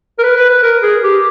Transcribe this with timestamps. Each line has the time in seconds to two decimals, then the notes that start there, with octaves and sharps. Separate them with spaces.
0.19 A#4
0.23 B4
0.36 B4
0.49 B4
0.63 A#4
0.83 G#4
1.03 G4